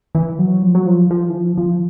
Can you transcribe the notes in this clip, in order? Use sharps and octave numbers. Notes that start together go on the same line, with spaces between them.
E3
F#3
F3
F#3
F3
F3
E3
F3
F3